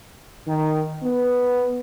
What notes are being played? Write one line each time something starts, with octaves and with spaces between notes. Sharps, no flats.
D#3
B3